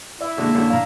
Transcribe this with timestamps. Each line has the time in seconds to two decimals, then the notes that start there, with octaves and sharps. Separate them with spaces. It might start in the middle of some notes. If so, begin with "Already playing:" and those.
0.21 E4 D5 E5
0.37 B2 D3 G#3 A#3
0.55 F#2 D3
0.70 A2 F#3 D4 F5 A#5